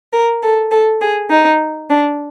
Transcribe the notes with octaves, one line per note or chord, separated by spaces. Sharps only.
A#4
A4
A4
G#4
D#4
D4